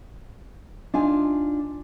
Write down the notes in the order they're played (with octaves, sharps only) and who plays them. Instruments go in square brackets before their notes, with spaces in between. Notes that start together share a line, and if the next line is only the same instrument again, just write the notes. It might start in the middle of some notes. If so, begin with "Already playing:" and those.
[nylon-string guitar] D4 D#4 F4 G#5